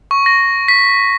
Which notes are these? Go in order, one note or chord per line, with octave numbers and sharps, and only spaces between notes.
C#6
A#6
B6